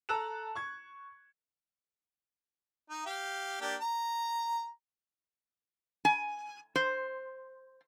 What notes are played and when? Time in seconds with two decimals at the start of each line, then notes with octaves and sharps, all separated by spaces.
0.09 A4 A5 A#5 E6 F#6 E7
0.55 C#6 G#6
2.90 D#4
3.06 G4 F5
3.61 A#3 D4 G4
3.81 A#5
6.05 G#5
6.76 C5